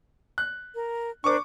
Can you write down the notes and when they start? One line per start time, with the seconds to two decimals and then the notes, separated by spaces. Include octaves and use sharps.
0.38 F#6
0.73 A#4
1.24 D4 A#4 C5 C#6 D6